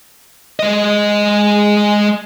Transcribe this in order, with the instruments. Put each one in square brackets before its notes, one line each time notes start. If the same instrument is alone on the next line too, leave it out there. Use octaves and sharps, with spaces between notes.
[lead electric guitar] G#3 D#5